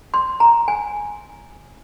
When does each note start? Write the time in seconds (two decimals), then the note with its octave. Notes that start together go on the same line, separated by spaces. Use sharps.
0.14 C6
0.40 A#5
0.68 G#5